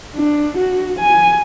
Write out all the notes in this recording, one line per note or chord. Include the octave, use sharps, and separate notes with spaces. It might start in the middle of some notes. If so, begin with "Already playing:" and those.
D4
F#4
G#5